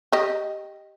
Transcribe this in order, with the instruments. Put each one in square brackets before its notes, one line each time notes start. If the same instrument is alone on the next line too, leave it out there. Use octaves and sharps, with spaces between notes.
[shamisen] G4 D#5